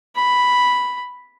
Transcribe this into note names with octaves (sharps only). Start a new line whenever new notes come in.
B5